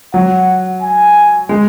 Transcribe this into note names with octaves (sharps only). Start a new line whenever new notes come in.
F#3 F#5
G#5
G#3